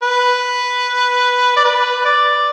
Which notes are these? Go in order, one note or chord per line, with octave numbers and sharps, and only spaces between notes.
B4
D5
B4
D5